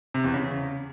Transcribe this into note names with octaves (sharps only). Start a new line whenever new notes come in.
C3
E2
C#3